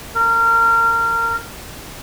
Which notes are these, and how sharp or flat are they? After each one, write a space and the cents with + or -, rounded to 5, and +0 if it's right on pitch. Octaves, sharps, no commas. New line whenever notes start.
A#4 -25